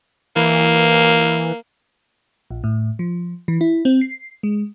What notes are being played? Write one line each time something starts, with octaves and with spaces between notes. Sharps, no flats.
E3 A#3
A#1
A2
F3
E3
E4
C4
C7
G#3